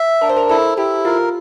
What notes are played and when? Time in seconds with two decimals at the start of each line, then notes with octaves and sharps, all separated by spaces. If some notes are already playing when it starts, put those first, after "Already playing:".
Already playing: E5
0.21 D4 A#4
0.29 C5
0.37 A#4
0.49 E4 A4
0.78 E4 G4
1.05 F4 A#4